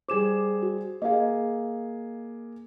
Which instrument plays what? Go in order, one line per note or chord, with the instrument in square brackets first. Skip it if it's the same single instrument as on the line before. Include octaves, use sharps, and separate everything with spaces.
[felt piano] G3 G#4 C5 [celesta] D6 E7
[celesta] F#4
[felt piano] A#3 G#4 [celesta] D#5 F5